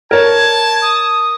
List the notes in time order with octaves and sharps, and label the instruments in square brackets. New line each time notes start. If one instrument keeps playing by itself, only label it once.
[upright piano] A#4 C#5 [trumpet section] A5 [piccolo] G#6
[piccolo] D#6